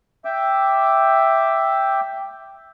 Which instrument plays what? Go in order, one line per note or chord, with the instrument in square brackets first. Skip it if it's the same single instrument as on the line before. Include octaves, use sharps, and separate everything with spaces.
[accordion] E5 G5 D6